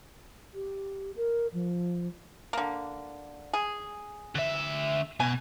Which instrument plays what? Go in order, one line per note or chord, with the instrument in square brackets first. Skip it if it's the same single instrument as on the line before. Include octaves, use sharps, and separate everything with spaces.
[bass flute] G4
A#4
F3
[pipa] D3 A#3
G#4
[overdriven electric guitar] D3 E5
[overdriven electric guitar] B2 [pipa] G#5